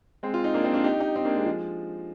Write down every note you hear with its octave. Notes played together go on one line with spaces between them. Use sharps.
G#3 C4
F4
D#4
A#3 D4
C4 D#4
D4 F4
D#4 G4
D#4 G4
C4 D#4
A#3 D4
G#3 C4
F3 G#3